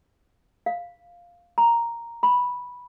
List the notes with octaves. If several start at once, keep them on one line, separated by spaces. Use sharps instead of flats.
F5
A#5
B5